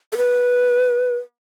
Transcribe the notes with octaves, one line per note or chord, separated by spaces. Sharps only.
A4
B4